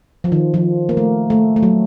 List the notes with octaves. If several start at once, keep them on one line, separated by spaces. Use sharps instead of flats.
F3
D#3
F3
A#3
A3
A3
A3
F#3